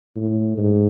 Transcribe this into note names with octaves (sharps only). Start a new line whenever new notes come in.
A2
G#2